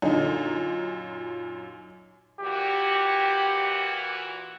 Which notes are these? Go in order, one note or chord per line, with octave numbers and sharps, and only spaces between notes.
F#2 A#2 D3 D#4
A#2 E3 F#4 G4